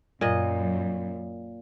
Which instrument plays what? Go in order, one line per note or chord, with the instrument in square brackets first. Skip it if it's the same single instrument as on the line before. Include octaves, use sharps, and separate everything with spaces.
[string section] F#2 [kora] A#2 D#5